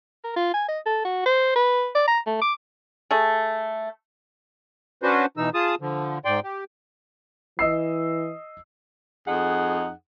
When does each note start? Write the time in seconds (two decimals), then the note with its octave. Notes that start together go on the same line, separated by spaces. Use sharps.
0.24 A#4
0.36 F4
0.54 G#5
0.68 D#5
0.86 A4
1.05 F#4
1.26 C5
1.56 B4
1.95 D5
2.08 A#5
2.27 A3
2.42 D6
3.11 A3 G#4
5.03 C#4 D4 F#4 B4 C5
5.37 B2 E3 D#4 E6
5.54 F4 G#4 A5 D#6
5.81 D3 F3
6.25 G#2 D5 G5 C6
6.43 G4
7.59 E3 D#5 E6 C7
9.28 F2 D#4 G#4 F#5